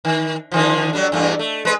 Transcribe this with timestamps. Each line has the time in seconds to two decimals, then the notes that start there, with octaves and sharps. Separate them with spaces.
0.05 D#3
0.51 D3 D#3 F3
0.93 F#3 G3 D4
1.12 E2 G2 A3
1.39 A3
1.65 G#3 B4